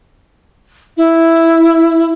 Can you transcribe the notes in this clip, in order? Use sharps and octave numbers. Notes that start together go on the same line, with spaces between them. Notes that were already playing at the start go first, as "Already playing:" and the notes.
E4